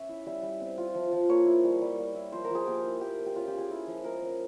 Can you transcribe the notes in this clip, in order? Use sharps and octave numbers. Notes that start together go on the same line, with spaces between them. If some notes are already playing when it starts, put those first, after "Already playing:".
Already playing: C#4 C#5 E5
E4
G3 E5
G3
C4
F4
F3
F3
A#3 C#5
E4
G3
G3
A#3
E4
F3 C5
A#4
F3 G#4
A#3 G4
E4
A#3 G4
A#3
G4
C#4 F4
F4 G4
G#4
E4
F3
G#3 A#4
C#4